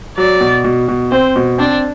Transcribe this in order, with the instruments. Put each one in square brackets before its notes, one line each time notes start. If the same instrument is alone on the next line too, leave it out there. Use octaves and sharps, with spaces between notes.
[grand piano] F#3 [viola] D5
[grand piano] B2
B2
B2
[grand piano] C4 [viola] C5
[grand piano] B2
[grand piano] C4 [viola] D4